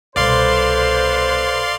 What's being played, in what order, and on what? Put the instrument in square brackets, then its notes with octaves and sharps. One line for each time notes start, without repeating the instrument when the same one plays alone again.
[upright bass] C2 B2 [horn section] A4 B4 C5 [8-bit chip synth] D5 F5 C6